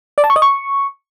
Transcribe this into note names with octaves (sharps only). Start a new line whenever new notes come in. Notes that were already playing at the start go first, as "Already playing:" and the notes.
D5
A5
C#6
D#5
C#6